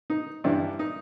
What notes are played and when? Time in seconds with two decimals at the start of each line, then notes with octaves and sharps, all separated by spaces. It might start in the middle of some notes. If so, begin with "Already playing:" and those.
0.10 D#4
0.44 G2 E3 G3 D4 E4
0.79 D#4